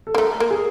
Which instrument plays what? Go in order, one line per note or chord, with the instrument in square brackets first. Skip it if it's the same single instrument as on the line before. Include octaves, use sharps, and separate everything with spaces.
[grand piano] A4
[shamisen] A#3
[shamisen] A3 [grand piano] A#4
[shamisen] A#3
[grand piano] G#4